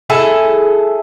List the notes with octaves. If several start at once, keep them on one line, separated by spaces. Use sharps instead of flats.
E4 G#4 A4 E5